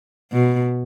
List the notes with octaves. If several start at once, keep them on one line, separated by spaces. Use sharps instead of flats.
B2